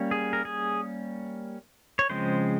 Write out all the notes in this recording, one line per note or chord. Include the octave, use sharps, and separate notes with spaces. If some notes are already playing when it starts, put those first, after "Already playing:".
Already playing: G3 A#3 C#4
G#4
A#4
G#4
C#5
C#3 F3 G#3 C4 C5